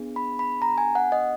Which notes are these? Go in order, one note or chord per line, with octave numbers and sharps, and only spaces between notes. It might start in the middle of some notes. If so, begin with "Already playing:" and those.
Already playing: B3 D4 G#4
B5
B5
A#5
G#5
F#5
D#5